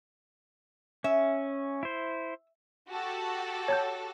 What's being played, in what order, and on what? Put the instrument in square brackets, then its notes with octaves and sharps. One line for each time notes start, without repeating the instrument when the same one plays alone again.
[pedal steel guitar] C#4 [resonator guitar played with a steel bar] E5
[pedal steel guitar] E4 C5
[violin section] F#4 G4 A4
[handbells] C#5 A5 G6